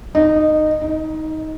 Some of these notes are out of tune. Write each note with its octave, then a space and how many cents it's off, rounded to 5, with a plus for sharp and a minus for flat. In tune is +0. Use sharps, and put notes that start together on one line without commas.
D#4 -15
D#4 +15